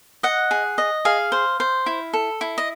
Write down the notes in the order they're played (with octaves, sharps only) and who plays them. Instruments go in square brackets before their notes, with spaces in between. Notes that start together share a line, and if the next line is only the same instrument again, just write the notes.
[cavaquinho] D#5 F#5
G#4
D#5
G#4 F5
C5
C5
E4
A4
E4
D#5